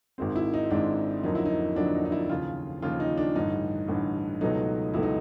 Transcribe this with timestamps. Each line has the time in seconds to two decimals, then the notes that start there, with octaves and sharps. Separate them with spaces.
0.18 G#1 G#2 D#3 G#3 C4
0.36 E4
0.54 D#4
0.71 G#1 G#2 D#3 G#3 C4 D4
1.23 F2 D3 F#3 A#3 D#4
1.35 E4
1.46 D#4
1.76 F2 D3 F#3 A#3 D4
1.95 D#4
2.05 D#4
2.12 E4
2.29 D#2 C#3 F3 F4
2.82 D#2 C#3 F3 F4
3.00 D#4
3.18 D4
3.35 A1 G2 D3 D#4
3.88 A1 G2 D3
4.41 C#2 B2 F#3 A3 D#4
4.94 C#2 B2 F#3 A3 E4
5.03 D#4